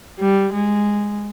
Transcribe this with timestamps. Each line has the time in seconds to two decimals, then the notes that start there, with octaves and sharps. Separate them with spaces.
0.20 G3
0.53 G#3